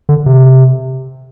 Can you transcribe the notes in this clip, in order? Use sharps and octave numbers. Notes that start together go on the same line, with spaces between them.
D3
C3